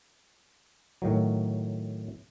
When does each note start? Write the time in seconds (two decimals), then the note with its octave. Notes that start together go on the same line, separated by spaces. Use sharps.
1.02 A2 D#3 F#3